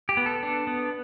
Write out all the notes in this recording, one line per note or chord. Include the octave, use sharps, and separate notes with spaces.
G4
B3
A4
D4
B3